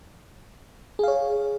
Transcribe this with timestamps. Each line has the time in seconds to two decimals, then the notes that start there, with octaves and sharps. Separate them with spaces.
0.99 G#4
1.03 F5
1.08 C#5